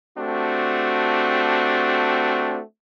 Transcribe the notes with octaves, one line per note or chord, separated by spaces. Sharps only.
A3 C4 D4 F#4 G4